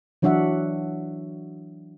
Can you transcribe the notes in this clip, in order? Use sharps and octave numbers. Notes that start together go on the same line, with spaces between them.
E3 F#3 D4 F#4 E5 F#5